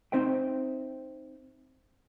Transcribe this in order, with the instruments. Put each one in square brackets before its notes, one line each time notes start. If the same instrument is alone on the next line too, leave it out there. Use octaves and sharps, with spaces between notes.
[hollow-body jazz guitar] C4 D#4 C5 E5 G5